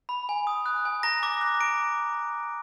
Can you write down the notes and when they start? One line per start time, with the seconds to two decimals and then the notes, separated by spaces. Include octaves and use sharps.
0.09 B5
0.29 G#5
0.47 D#6
0.66 F#6
0.85 G#5
1.03 A#5 A#6
1.23 D6 A#6
1.41 F#6
1.61 A#5 D7